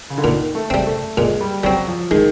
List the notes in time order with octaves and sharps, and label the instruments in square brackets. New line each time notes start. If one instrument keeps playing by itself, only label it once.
[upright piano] C#3
D3
[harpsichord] A#2 [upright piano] D#3
[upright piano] A3
[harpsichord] G3 C4
[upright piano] A3
[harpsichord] A#2 [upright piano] G#3
[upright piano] G3
[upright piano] F#3 [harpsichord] G3 C4
[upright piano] F3
[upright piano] D#3 [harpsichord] G#3